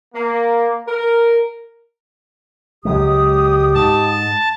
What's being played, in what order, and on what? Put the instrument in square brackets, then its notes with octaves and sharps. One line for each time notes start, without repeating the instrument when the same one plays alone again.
[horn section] A#3
A#4
[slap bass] C#2 F#3 G#3 [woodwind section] G4 D#6
[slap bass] G#2 [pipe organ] A5